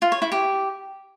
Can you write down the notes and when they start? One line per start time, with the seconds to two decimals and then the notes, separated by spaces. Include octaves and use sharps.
0.02 F4
0.12 C#5
0.22 E4
0.32 G4